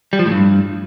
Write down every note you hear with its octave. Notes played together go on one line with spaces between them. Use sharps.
G3
F3
A2
G2